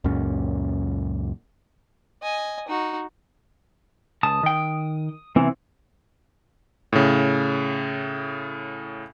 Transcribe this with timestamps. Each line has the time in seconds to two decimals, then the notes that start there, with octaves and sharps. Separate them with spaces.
0.04 C#2 F#2 A#2 C#4
2.22 D#5 G#5
2.68 D#4 F#4
4.23 C#2 A5 D#6
4.43 D#3 G5
5.36 C3 E3 B3 C4 E4
6.93 A2 C#3